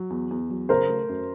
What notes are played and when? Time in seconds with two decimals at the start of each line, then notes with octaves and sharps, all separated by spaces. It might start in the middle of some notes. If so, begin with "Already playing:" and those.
Already playing: F#3
0.10 E2
0.31 E2
0.50 F#3
0.69 C#3 A#4 C5
0.89 A3
1.09 F#2